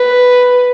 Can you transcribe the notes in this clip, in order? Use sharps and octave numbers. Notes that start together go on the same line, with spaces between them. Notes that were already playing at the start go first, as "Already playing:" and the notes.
Already playing: B4